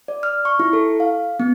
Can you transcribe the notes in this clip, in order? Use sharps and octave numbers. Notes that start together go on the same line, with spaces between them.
D5
F6
C#6
E4
A4
F5
B3